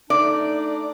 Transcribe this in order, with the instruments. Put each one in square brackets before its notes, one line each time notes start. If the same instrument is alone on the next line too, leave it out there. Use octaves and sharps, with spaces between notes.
[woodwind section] A3 D4 D#4 [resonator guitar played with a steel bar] D5